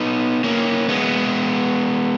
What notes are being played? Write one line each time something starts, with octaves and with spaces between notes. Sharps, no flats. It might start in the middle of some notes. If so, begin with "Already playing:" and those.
Already playing: B3 D#4
A#3 C#4
G#3 B3